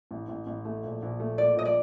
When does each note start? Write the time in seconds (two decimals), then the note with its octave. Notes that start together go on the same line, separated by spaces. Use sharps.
0.11 A1
0.28 A1
0.47 A1
0.65 A3
0.83 A#1
1.02 A#1
1.20 A3
1.38 A#2 D5
1.56 A#1 D#5
1.65 D5